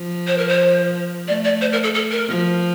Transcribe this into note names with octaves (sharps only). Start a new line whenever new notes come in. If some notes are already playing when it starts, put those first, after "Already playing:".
Already playing: F3
C5
A#4
C5
A3 D5
D5
C5
A#4
A4
A4
A#4
F3